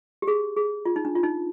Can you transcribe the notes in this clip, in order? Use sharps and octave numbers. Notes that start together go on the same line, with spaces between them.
G4
G#4
G#4
F4
D#4
D4
F4
D#4